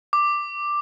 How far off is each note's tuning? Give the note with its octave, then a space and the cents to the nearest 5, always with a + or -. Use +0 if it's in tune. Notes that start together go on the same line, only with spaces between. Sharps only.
D6 +5